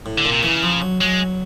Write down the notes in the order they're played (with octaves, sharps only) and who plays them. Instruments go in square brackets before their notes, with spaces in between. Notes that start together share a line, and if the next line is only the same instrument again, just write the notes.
[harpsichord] A2
[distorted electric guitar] D3
[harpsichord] A#2
[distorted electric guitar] C3
[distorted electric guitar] C#3 [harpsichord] E3
[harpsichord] F3
F#3
[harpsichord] F#3 [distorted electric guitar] G#3